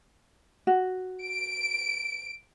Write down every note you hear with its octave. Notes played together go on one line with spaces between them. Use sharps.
F#4
D7